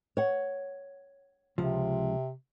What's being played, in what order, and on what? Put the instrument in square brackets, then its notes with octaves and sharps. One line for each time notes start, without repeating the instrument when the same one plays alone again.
[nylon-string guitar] C#5 F#5
[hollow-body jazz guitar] C#2 F3 [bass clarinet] C3